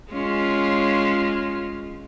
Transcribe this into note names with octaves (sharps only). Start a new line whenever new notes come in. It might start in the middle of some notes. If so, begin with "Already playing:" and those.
G#3 C#4 F4